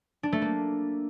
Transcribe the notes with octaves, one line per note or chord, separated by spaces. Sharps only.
D4
A3
A#3